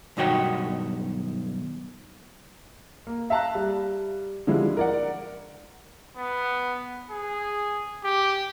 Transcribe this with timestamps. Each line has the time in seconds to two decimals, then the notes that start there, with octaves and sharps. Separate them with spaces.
0.17 B1 G2 D#3 F#4 C#5 G5
3.07 A#3
3.30 E5 F5 A5 A#5 F#6
3.55 G3
4.47 D3 F3 G3 G#3 E4
4.77 A#4 D5 F#5
6.17 B3
7.11 G#4
8.04 G4